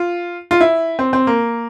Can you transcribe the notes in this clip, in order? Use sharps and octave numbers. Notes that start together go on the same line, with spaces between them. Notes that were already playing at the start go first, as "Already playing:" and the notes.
Already playing: F4
F4
E4
C4
C4
A#3